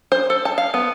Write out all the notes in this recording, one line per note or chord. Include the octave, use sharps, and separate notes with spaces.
C5
A4
A5
F5
B3